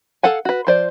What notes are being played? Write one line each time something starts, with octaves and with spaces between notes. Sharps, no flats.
A4 F5 F#5 G#5
F#4 B4
F3 C5 D5